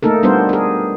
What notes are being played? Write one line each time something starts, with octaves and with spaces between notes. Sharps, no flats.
A3 A#3 D#4 A4 A#4
G3 B3 D4 F4 A#4 C5
G#4 A#4